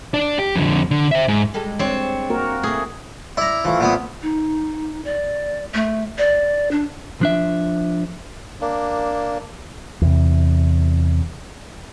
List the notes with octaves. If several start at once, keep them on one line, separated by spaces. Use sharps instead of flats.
D4 D5
G4
F2 D3
D3
C5 E5
G#2
G3 G#3 A4
C4 D4 C#5
A#3 F#4 A#4
E3 A3 A#3 G#4
E4 D5 A#5
E3 F3 A3 F5
A#2 B3 D#6
D#4
D5
A3
D5
D4
F3 D4 E5
A#3 D4
E2 C3